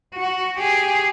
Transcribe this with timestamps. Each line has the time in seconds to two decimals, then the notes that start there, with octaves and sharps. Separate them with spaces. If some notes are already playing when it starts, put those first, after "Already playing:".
0.15 F#4
0.58 G4 G#4